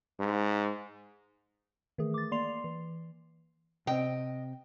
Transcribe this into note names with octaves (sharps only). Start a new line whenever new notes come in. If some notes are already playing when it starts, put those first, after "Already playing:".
G#2
D#3 E3 A3 G#4
D6 A6
A#3 D5 C6 C7 F7
E3
C3 C4 D#5 G5